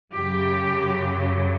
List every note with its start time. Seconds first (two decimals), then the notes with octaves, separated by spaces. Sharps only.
0.13 F#2 C#3 F#3 G4